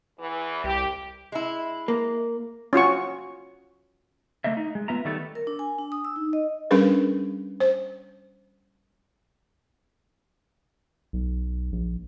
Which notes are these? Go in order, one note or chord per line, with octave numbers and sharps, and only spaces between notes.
E2 E3
C2 G4
G#3 E4
A#3
C#4 F4 F#4 C#6
D3 A3 A#3 D#5 E5
D#4
G#3
B3 F4 E5 A#5
D#3 G3 A3 B3 A4
A#4
D4
G#5
D4
D#6
E6
D#4
D#5
G3 C#4 D4 G#4 A#4 B4
C5
B1
A#1